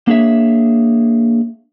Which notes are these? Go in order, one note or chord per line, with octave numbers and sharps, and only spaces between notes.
A#3 D4 G#4 C#5 E5